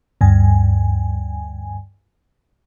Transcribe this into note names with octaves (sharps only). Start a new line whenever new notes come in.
D2 G2 G#5